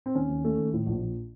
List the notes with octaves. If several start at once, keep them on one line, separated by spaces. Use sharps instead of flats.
C4
D#2 C#4
D#2
A3
D#2
A2
A#1
A#1